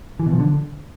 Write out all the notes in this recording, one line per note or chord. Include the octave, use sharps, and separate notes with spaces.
E3
B2
F3
D3